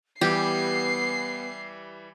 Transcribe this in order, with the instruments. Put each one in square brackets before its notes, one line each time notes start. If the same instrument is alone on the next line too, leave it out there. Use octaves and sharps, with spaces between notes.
[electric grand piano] E3 G3 [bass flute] B3 [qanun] G4 [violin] C7